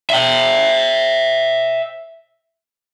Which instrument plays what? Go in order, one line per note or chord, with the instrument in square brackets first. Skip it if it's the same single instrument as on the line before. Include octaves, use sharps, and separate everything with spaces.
[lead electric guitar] E5 G5